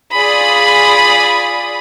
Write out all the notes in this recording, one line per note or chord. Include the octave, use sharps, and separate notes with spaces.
F4 G#4 D5 B5 D#6